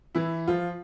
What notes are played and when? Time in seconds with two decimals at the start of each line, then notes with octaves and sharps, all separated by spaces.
0.15 E3 E4
0.48 F3 F4